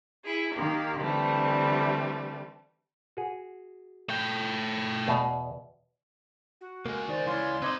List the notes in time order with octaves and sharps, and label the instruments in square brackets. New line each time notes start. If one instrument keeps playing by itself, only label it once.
[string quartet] E4 G#4
D#3 A#3 G4
D3 E3 G3 A3 C4
[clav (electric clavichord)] F#4 G#4
[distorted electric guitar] A3 G5
[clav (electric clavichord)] E2 B2 D5
[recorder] F#4
[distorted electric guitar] C#2 G#3 [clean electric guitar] A#3
[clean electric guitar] D#3 [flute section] C5 D5
[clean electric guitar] E3 [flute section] C#5 D5 F5 [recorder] C6
[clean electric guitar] C4 D#4 D#5 [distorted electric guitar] B4 C5 [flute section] D6 G#6